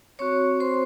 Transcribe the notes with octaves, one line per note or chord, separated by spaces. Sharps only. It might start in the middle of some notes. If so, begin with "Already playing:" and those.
C4 F#4 C#5 C#6
C5 C6